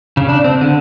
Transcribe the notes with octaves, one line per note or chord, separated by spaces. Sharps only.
C#3
D4
C4
D3